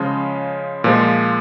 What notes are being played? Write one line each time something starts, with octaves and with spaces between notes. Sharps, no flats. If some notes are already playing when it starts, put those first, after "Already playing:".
Already playing: C#3 F3 G#3 C#4 F4
A#2 F3 G#3